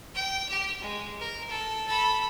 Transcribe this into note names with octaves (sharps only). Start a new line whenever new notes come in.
G5
G4
G#3
A#4
A4
A4 B5